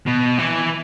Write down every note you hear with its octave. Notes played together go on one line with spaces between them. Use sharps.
B2
E3